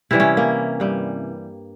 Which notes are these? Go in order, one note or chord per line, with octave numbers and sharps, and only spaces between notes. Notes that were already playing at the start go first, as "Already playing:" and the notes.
C3 E3 G3 E4
C#4
A#3
G2 G3